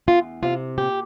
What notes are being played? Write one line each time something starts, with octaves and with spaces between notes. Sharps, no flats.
E2 F4
C3 F4
A#2 G4